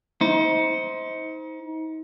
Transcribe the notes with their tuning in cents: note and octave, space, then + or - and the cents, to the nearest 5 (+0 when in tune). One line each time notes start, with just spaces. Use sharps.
D#4 +35 C5 -5